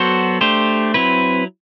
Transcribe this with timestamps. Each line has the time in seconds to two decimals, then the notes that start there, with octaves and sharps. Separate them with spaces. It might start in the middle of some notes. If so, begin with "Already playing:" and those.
Already playing: F#3 B3 F#4 A4 C5
0.41 A3 D4 G4 C5
0.94 F#3 C4 E4 B4